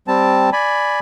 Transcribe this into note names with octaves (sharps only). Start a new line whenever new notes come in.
G3 C4 A5
D5 G#5 B5